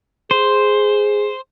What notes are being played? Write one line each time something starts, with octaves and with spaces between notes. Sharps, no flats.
G#4 C5